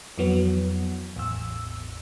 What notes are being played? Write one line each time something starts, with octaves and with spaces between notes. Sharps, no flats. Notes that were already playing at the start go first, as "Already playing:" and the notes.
F2 E3 F#3 B3
A1 E2 E6